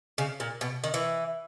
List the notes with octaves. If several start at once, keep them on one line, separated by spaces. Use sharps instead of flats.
C#3
A#2
B2
D#3
E3